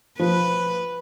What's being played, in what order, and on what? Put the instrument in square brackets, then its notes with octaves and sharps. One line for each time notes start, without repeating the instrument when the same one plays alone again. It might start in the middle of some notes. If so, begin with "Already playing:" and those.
[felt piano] F3 [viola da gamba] B4